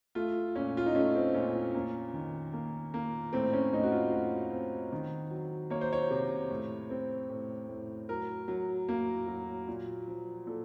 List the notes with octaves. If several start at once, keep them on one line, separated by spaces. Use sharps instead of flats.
A3 F4
A#2 C#4
F4
D#4
A3 C#4
C4
A#2 C#4
C4
A#3 C#4
D#3
A#3
A#3
A2 C4
C#4
A2 D#4
F#4
F4
A2 F#4
C4
D#3
F#3
A#3 C#5
C5
C#5
C3
A2
C4
A2
A2
F#3 A#4
F#3
A#3
F#3
A#2
F3
A#2 A4